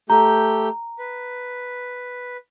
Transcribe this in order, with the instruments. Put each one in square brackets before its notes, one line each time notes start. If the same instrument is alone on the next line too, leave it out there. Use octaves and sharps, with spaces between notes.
[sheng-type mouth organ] A3 G4 G6 [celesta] A#5
[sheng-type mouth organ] B4